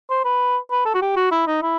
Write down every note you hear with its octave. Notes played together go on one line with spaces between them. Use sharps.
C5
B4
B4
A4
F#4
G4
F#4
E4
D#4
E4